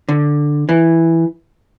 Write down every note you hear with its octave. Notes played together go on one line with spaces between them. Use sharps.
D3
E3